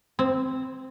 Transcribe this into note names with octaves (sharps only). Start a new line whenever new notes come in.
C4